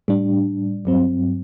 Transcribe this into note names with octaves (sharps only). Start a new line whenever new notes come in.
A2 G3 D4
G2 F#3 C4